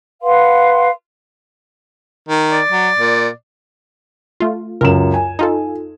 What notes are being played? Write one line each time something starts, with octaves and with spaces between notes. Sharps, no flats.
B4 F5 F#5 C6
D#3
D5
F#3
A#2
A3 F4
C#2 F#2 A#4 E7
G#5
D#4 F4 A4